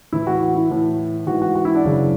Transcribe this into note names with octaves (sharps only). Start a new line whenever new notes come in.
A2 E3 E4
F#4
F#4
E4
A2 E3
G#2 E3 F#4
F#4
F#4
E4
D4
F#2 C#3 E3